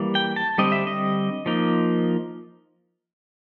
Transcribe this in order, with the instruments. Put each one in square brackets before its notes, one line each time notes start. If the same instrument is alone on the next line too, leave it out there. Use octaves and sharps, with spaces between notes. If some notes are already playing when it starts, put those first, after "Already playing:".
Already playing: [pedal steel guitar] E3 G3 A#3
G5
A5
D3 G3 C4 D#5
E5
D#5
F3 A#3 D#4